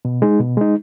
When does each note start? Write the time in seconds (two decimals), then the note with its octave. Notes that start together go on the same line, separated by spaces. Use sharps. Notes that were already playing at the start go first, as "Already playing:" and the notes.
0.05 B2
0.22 G#3 D#4
0.39 B2
0.57 G#3 D#4